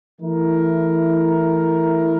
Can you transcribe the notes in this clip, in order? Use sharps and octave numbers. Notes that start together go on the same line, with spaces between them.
E3 A3 E4 A#4